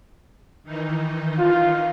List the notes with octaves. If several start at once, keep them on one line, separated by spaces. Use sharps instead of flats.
D#3 E3 D#4
F4